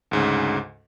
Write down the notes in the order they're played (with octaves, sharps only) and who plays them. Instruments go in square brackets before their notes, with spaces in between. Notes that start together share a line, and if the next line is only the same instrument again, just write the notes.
[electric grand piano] D2 G#2 C#3